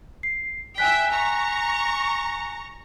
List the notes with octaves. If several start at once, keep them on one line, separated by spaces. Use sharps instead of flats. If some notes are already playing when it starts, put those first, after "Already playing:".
C7
E5 G5 G#5 F#6 B6
A#5 C#6